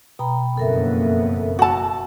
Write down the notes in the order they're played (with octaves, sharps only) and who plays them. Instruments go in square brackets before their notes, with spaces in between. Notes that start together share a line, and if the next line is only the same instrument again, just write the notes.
[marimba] B2 [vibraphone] G5 A#5 B5
[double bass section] F#1 F2 B3 [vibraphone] A4 A#4 E5
[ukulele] F#4 A5 [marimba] F#5 B5 E6